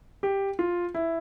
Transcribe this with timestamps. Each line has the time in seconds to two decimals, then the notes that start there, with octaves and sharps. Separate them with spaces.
0.23 G4
0.59 F4
0.95 E4